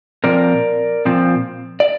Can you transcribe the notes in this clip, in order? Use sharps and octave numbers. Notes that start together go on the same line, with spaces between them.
A#2 F3 C4 A#4 D5
A#2 F3 C4
D5